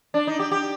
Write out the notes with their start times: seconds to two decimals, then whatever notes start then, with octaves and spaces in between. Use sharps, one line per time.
0.14 D4
0.27 D#4
0.39 G4
0.51 G4